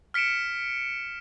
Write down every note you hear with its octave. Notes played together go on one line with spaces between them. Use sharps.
F6 B6 C#7 D7 E7